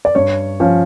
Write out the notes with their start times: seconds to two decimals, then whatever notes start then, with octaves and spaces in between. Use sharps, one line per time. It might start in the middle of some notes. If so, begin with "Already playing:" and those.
0.05 D5
0.15 G2 C#5
0.60 F3 C#4